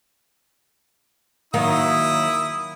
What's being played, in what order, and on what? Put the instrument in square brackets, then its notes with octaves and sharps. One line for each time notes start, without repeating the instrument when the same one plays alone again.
[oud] D#3 F#3 A#3 [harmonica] E4 D#6